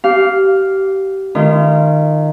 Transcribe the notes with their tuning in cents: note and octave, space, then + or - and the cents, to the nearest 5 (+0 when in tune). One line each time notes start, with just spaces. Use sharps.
G4 -25 F5 +0
D#3 -20 A3 -40 F4 -35